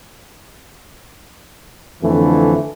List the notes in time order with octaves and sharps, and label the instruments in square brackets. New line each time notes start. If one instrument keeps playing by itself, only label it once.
[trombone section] F2 D3 E3 A3